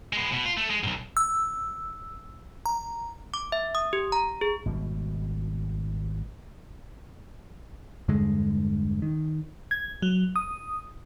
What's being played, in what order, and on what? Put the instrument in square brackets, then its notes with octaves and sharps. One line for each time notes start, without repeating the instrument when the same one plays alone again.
[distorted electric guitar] G#3 B3
B2 B3
F4
A3
G#3
B1 G#2
[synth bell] E6
A#5
[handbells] D6
E5
D#6
G4
A#5
G#4
[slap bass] G#1 B2 G3
[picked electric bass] E2 G2 D3 G#3
D#3
[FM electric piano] G#6
F#3
D#6